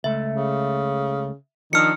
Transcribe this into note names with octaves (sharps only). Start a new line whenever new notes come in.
C#2 A3 E5
C#3
D#3 F3 D4 E6 F6 C#7